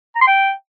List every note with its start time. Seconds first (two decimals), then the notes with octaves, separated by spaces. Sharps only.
0.15 A#5
0.21 C6
0.27 G5